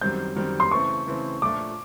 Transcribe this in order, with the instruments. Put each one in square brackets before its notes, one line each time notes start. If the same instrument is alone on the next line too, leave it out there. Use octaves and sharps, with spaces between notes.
[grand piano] F#2 D#3 G3 C4 [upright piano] G6
[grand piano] F#2 D#3 G3 C4
[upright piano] C6
[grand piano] C#3 E3 A3 C4 [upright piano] C#6
[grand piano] C#3 E3 A3 C4
[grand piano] A#2 F3 A3 D4 [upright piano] D6